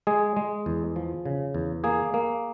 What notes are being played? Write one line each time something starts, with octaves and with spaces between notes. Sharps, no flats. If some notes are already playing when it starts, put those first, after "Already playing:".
G#3 G#4
G#3
E2
F3
C#3
E2
A#3 G#4
A#3